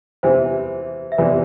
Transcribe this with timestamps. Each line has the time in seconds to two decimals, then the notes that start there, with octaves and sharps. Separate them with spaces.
0.23 E2 C3 E3 C5
1.12 E5
1.18 E2 C3 E3 B4 D5